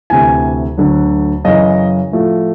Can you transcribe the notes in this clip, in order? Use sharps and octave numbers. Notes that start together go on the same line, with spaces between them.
D2 C3 E3 G#5
D2 D3 F#3
F#2 C#3 E3 D#5
A2 F3 A3